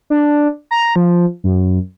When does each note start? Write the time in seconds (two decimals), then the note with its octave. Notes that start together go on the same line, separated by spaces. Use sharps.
0.10 D4
0.71 A#5
0.96 F3
1.44 F#2